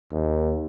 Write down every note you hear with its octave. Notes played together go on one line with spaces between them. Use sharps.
D#2